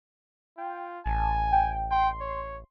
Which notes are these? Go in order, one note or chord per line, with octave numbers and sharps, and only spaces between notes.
F4 G5
A1 G#5 A5
G5
G5 C6
C#5